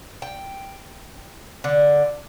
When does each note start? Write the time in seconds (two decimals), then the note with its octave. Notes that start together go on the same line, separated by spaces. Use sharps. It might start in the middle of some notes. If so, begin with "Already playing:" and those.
0.22 G5
1.64 D3